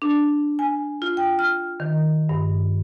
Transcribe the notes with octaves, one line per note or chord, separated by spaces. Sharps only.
D4
G#5
F4
G5
F6
D#3
G2